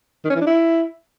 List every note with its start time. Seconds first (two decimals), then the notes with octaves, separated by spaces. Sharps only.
0.24 D#3
0.30 C#4
0.36 E3
0.41 D4
0.47 E4